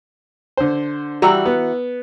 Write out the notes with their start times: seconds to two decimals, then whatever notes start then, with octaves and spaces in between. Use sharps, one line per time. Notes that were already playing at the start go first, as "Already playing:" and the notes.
0.57 D3 C5
1.22 E3 G3 F#4 A#5 E6
1.46 B3